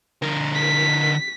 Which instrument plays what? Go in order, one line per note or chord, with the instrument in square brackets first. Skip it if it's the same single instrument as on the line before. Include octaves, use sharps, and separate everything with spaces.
[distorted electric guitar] D3 A#4
[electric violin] B6